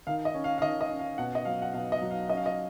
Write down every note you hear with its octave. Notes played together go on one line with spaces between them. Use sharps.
D#3 F5
D#5
C#4
F5
F5
D#3 D#5
D#5
C#4
F5
B2 F#5
D#5
F#3 F5
F#5
B2 F5
D#5
F#3
F5
C#4 D#5
F5
D#5